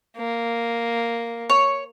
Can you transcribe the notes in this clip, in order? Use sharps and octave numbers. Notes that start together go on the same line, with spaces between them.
A#3
C#5